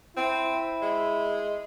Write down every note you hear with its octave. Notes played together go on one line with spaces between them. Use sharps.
C4 E4
G#3